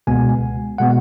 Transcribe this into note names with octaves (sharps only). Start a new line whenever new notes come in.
C#2 B2 G#3 B3 G#5
B2 G#3 B3 F#5